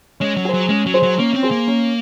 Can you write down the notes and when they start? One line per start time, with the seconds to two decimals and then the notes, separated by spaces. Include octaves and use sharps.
0.20 G#3 C#4
0.37 F#3
0.45 G#4 C5
0.54 F#3
0.69 G#3 C#4
0.86 F#3
0.94 G#4 C5
1.03 F#3
1.18 A#3 C#4
1.34 C4
1.42 G#4 C5
1.51 A#3
1.68 C#4